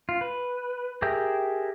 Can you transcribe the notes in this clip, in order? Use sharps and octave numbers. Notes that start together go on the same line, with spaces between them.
F4
B4
G4 G#4 A#4 E5 G5